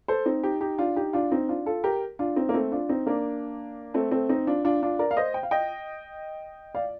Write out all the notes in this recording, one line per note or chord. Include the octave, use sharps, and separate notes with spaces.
A4 C5
C4 D#4
D#4 G4
D#4 G4
D4 F4
D#4 G4
D4 F4
C4 D#4
D4 F4
F4 A4
G4 A#4
D4 F4
C4 D#4
A#3
A3 C4
D4 F4
C4 D#4
A#3 D4
A3 C4
A3 C4
C4 D#4
D4 F4
D4 F4
D4 F4
A#4 D5
F5
C5 D#5
G5
F5
D#5 G5
D5 F5